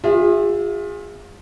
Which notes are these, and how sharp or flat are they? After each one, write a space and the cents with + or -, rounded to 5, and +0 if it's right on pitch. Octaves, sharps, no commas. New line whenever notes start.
F4 +30 G#4 -30 E5 +0